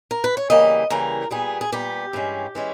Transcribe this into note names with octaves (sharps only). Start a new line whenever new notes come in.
A#4
B4
C#5
C#3 E3 G3 A#3 D#5
C#3 E3 G3 A#3 A#4
A#2 G3 B3 G#4
G#4
A#2 G3 B3 G4
G2 E3 G#3 C#4
E3 G#3 C#4